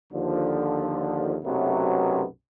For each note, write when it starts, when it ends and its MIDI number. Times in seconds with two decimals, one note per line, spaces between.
0.13 1.36 39
0.13 1.36 50
0.13 1.36 53
1.44 2.24 35
1.44 2.24 42
1.44 2.24 48
1.44 2.24 54
1.44 2.24 57
1.44 2.24 59